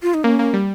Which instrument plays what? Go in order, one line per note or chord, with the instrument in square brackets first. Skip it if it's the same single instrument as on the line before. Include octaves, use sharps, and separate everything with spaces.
[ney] F4
D#4
[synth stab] A#3 [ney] C#4
[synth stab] A#3
G3